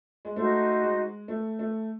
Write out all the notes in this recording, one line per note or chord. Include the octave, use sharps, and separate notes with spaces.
G#3
A3 D#4 F#4 C5
G#3
A3
A3